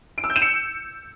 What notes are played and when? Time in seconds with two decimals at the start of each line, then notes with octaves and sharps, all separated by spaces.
0.18 D7
0.24 E6
0.30 G6
0.36 E7
0.42 C#7